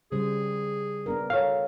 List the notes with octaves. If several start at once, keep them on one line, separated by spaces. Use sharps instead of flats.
C#3 G3 G#4 C5
B3 D4 A#4
F#4 A4 C#5 F5